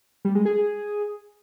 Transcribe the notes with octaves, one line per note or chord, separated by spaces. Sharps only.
G3
G#3
G#4